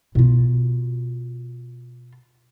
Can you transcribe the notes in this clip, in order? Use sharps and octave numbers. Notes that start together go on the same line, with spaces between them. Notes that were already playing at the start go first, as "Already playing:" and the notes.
B2 F4